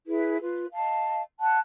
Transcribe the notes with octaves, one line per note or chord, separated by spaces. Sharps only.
E4 G#4 B4
F4 B4
D#5 F5 A5
F#5 A5 F#6